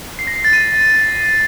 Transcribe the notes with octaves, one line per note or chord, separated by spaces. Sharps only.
C7
A#6
C7
A6
D#7